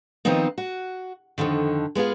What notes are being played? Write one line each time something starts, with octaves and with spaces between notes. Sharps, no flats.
D#3 F3 B3 C4 D#4
F#4
F2 A#2 D3 D#3
G#3 B3 F4 G#4